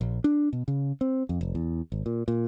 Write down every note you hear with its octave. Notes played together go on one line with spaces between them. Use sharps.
A#1
D4
B2
C#3
C4
F2
F1
E2
G#1
A#2
A#2